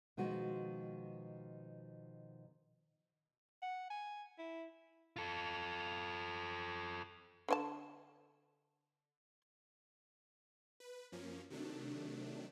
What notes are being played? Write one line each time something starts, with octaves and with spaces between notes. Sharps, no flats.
B2 D#3 F3 G#3 F#4
F#5
G#5
E4
F4 A4
D3 C#4 A5
B4
F#2 F3 A#3 C#4
C3 D#3 F#3 A3 D4